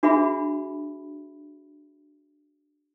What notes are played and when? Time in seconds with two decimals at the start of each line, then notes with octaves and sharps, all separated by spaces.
0.03 D4 F#4 G#4 E5 B5